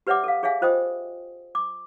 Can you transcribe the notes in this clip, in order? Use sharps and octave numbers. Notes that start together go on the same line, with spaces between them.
G4 B4 C#5 E5 F#5 D6
A4 F5
G#4 C#5 E5 F5 G#5
F4 C5 D#5 G5 D#6
D6